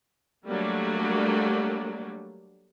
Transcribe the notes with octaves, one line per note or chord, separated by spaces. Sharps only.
F#3 G3 A3 A#3 D4